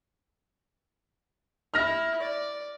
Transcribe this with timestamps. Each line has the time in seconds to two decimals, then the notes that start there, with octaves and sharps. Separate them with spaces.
1.74 E4 E5 F6 A#6
2.20 D5